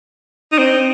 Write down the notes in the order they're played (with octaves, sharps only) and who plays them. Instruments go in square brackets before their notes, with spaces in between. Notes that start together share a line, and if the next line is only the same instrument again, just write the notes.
[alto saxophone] D#4
C4